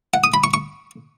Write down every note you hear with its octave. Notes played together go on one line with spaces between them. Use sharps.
F#5
D#6
B5
C#6
C#6